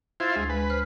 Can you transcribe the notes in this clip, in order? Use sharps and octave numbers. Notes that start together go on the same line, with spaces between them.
E4 F4 C5 G#6 A6
D2 G#3
G#3 B4
C5 F6